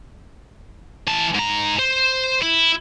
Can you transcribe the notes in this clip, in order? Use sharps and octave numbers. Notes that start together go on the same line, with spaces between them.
E3 A5
G#2 A#5
C5
E4